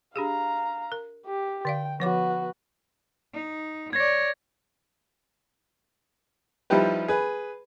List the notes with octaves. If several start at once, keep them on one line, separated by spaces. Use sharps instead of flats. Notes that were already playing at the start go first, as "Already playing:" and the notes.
D4 G4 G#4 F5 A#5
A#4
G4
D3 D5 F5 G5
F3 B3 F#4 C#5 D6
D#4
C#5 D5 G#6 A#6
F3 G3 D#4 E4 G4 B4
G#4 B4